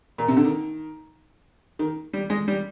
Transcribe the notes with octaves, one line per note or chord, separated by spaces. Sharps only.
A#2
C3
D3
D#3
D#3
G3
G#3
G3